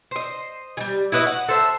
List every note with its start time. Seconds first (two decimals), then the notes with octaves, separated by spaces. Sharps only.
0.11 C5 D#5
0.77 E3 G3
1.12 E4 F#4 B4 D#5
1.27 F#5
1.49 A4 C5 E5